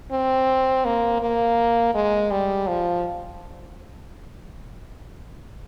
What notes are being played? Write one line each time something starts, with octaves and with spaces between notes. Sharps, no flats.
C4
A#3
A#3
G#3
G3
F3